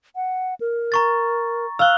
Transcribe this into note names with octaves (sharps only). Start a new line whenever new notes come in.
F#5
A#4
A#5 C#6 A6
F5 E6 F#6 G7